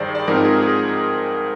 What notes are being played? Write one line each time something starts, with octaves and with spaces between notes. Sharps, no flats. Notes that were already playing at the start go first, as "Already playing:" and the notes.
Already playing: G2 D#3 G3 G#4 C5 D5
D5
G#2 F3 C4 D#4 A#4
G#4
G#4